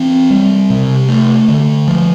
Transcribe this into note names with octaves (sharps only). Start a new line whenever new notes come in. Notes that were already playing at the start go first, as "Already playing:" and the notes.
Already playing: E3 C4
G3
C3
A3
D3
F3